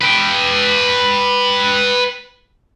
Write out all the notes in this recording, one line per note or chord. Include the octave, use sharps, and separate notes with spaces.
B4 G5